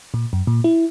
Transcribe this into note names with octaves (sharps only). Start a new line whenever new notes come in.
A#2
F#2
A#2
E4